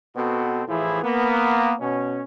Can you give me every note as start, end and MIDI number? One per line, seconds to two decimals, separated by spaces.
0.16 0.62 47
0.16 0.62 59
0.16 0.62 60
0.16 0.62 66
0.16 0.62 69
0.67 1.02 45
0.67 1.02 52
0.67 1.02 53
0.67 1.02 64
0.67 1.02 68
1.03 1.72 58
1.03 1.72 59
1.80 2.21 47
1.80 2.21 61